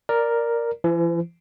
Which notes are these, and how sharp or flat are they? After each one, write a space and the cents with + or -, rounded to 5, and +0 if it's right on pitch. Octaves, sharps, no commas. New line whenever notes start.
A#4 +0 D5 +0
E3 +40 C5 -20